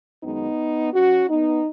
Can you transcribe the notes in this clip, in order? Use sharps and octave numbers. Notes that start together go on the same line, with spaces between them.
F#2 D#3 G#3 B3 D#4
F#2 F#3 C#4 F#4
B3 D#4